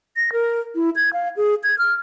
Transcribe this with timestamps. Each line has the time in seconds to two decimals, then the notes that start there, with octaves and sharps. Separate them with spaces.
0.16 A#6
0.33 A#4
0.75 E4
0.96 G#6
1.13 F5
1.37 G#4
1.64 G#6
1.78 F6